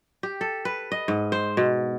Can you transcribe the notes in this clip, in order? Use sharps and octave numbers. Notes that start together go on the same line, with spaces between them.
G4
A4
B4
D#5
G#2
C5
B2